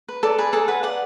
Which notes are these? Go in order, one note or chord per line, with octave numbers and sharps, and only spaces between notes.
B4
A4 D5 A5
G#4 B4 B5
G#4 A4 A5
B4 F#5
D5 F#5